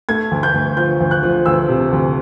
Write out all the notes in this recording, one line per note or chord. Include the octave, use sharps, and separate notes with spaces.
A3 G#6
D2
G6
D2
F3 G6
D2
F#6
F3
D2 E6
C3
D2